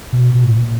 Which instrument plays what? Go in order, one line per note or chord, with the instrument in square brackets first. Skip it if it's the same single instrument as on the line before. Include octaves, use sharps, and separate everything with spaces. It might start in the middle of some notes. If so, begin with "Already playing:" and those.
[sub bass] B2
B2
A2
A#2